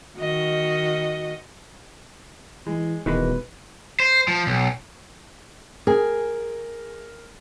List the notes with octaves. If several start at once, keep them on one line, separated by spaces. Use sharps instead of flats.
D#3 F#4 D#5
E3 G#3
D#1 B2 D#3 E3 G#3 B4
C5
F3
B1
G#4 A#4